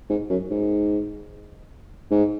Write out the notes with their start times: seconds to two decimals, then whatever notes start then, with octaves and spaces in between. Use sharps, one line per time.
0.10 G#2
0.30 F#2
0.50 G#2
2.11 G#2